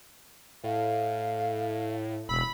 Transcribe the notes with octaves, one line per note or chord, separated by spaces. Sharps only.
A2 F5
E1 B5 E6